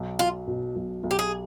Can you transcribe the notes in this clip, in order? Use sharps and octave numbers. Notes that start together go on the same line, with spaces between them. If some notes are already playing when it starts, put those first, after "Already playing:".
Already playing: B1
F#3 F4
B2
B1
B1
G4
G#4